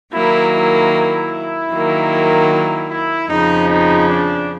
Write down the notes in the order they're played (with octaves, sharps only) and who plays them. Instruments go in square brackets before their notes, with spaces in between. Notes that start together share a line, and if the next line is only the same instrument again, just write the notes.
[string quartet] D#3 F#3 A#3 [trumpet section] E4
[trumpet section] E4
E4
[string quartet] D#3 F#3 A#3
[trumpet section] E4
E4
[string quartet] F2 C#3 F3 [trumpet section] D#4
[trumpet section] D#4
D4